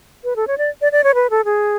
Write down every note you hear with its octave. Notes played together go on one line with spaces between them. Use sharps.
B4
A4
C#5
D5
D5
D5
C#5
B4
A4
G#4